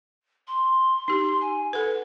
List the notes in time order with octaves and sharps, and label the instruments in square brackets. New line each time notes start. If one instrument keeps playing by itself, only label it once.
[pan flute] C6
[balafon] D#4 G4
[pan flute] G#5
[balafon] A4 B4 [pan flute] F#5